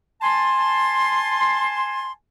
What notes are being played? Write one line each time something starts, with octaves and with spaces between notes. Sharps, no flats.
G#5 A5 C6